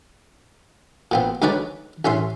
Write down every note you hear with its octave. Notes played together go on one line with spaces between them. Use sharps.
A#2 B3 C4
D2 G#3 D#4 B4 C#5 D5
A1 C#4 E5 C6